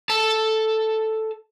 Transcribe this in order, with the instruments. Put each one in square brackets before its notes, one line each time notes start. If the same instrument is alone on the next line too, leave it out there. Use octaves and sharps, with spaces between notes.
[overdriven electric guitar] A4 A5